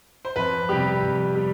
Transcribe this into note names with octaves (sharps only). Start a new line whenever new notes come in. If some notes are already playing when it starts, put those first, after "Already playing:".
C5
F2 B4
C3 G3 G4
F2
G3